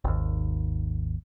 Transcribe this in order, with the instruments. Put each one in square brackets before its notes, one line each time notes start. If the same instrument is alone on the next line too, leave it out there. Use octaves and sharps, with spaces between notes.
[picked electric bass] G#1 D#2